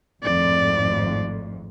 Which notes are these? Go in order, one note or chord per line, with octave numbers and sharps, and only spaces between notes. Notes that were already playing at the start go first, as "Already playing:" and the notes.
G#1 F2 A2 D5